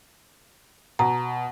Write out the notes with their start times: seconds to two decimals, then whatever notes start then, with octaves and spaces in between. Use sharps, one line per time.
0.99 B2 A#5